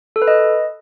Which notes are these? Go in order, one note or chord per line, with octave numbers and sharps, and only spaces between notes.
A4
B4
D#5